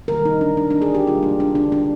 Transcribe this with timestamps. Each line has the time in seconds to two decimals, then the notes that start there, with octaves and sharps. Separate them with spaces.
0.08 C3 D#3 G3 A#3 A#4
0.25 D#4
0.41 D4
0.57 D4
0.71 D4
0.82 G#4
0.95 G4
1.06 C3 G3 A#3 F4
1.23 D4
1.40 D4
1.55 D4
1.72 D4